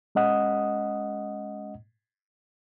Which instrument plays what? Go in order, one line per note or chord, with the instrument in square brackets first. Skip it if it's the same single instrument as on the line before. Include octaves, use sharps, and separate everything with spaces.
[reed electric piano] G#3 C#4 D#5 F#5 D#6